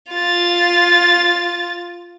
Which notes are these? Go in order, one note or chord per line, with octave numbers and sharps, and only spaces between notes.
F4 A6